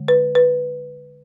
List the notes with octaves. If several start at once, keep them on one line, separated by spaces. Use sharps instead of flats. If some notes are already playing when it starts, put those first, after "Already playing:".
Already playing: D3 G#3
B4
B4